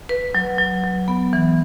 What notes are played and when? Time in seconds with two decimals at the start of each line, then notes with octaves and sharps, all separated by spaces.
0.09 B4
0.35 F#3
0.58 F#3
0.84 F#3
1.08 B3
1.33 E3